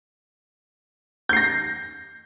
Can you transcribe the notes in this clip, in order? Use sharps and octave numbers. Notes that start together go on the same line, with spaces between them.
G6 A#6 C7